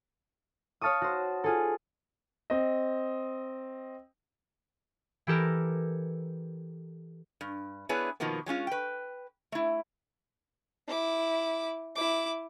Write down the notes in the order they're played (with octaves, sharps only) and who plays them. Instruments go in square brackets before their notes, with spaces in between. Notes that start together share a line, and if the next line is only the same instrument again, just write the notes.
[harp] C#5 F5 A5 C#6 D#6
F#4 C5
F4 G#4 A4
[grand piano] C4 D#5
[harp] E3 G4 A4 A#4
[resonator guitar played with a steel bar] G2
B3 D4 E4 G#4 B4 C#5
B2 D#3 F3 A#3 B3
F#3 G#3 C#4 F4
B4 G5
A3 E4
[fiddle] E4 D6
E4 D6